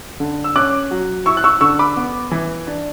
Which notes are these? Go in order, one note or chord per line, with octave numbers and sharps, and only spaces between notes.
D3
E6
C#4 D6 F#6
F#3
E4 C#6 E6
F#6
C#6 E6
D3 C#6 E6
B5 D6
B3
E3
D4